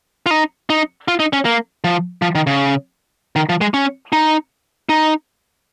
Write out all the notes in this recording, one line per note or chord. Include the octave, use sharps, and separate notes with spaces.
F4
D#4
D#4
F4
D#4
C#4
A#3
F3
F3
D#3
C#3
D#3
F3
G#3
C#4
D#4
D#4